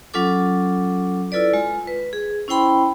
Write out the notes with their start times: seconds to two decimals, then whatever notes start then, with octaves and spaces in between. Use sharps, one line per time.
0.14 F#3 C#4 F4 A4 D6
1.32 E4 F4 A4 B4 D5
1.53 G#3 F4
1.88 B4
2.13 G#4
2.48 C#4 E4 C5 G5 B5 C6